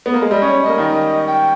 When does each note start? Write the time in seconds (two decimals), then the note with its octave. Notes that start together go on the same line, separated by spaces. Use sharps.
0.06 B3
0.13 A#3
0.22 G#3
0.30 G3 D#5
0.42 C#4
0.46 C#5
0.55 C#4
0.62 D#5
0.67 A#3
0.78 D#3
1.27 G5